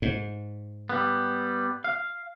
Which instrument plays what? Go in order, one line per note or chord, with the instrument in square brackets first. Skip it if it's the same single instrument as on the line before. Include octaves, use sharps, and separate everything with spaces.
[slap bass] G#2
[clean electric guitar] G3 B3
F5